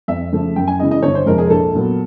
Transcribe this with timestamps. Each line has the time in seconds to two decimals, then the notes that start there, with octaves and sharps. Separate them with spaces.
0.08 F2 E5
0.32 C#3 F3 A3
0.56 F#2 G5
0.67 G#5
0.79 C#3 E3 G#3 D#5
0.91 D#5
1.03 G1 C#5
1.15 C5
1.26 F2 C3 F3 G#3 A#4
1.38 G#4
1.46 A#4
1.50 A#1 A4
1.74 A#2 F#3 B3